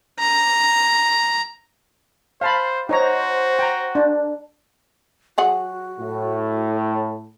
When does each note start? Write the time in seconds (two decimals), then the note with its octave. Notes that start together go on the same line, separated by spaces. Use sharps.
0.19 A#5
2.41 C5 F5 A5 B5
2.89 D#4 F#4 C5 C#5 A#5
3.59 G5 A#5
3.95 D4
5.38 F#3 F#4 G#4 F#5
5.99 A2